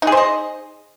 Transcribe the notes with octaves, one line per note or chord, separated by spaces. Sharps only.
D#4 G#4 C5 D#5